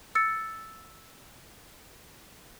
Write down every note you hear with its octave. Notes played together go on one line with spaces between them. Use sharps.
E6 A6 C#7